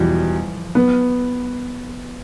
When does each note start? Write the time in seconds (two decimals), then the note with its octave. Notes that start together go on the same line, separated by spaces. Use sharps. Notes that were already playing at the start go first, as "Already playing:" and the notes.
Already playing: E2 B2 E3 F3 G3
0.75 B3